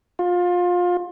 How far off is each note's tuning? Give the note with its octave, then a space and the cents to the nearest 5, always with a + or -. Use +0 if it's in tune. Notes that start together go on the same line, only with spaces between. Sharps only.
F4 +25